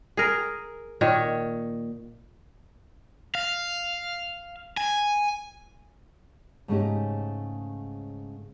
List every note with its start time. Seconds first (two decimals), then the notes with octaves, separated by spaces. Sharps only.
0.17 G#4 A#4
1.01 A#2 D#3 C#5
3.35 F5
4.77 G#5
6.68 G#2 C#3 A3 C#4 D#4 G4